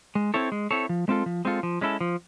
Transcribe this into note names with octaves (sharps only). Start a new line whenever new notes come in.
G#3
C4 E4 A4 C#5
G#3
C4 E4 A4 C#5
F3
G#3 C4 F4 A4
F3
G#3 C4 F4 A4
F3
G#3 C#4 E4 A4
F3